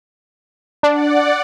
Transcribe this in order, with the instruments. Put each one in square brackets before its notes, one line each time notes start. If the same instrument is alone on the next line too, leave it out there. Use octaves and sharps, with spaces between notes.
[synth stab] D4 [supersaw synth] D5 F#5